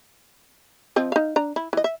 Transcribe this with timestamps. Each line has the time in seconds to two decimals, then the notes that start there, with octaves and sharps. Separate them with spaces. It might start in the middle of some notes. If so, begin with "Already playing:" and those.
0.96 F3 C4 D#5
1.12 D#4 F5
1.36 D4 A#5
1.56 E4
1.73 E3 D#5
1.84 E5